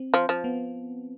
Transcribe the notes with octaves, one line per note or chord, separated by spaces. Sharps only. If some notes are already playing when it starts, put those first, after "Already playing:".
Already playing: C4
F3
F3
B3